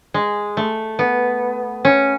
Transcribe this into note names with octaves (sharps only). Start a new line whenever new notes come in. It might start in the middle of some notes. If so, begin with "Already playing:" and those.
G#3
A3
B3
C#4